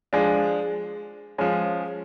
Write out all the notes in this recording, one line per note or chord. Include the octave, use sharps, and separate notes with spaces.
F3 G#3 D4 G#4
F3 G#3 C#4